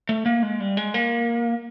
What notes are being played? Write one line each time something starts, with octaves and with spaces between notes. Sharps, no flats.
A3
A#3
G#3
G3
G#3
A#3